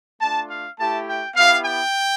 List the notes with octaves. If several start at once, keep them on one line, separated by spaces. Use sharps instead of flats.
A3 D4 F4 A5
F5
A3 E4 G4 A5
G5
B3 E4 G4 F5
G5